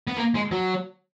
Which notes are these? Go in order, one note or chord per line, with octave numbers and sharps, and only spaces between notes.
B3
A#3
G#3
F#3